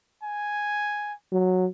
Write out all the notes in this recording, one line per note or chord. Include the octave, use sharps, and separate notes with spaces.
G#5
F#3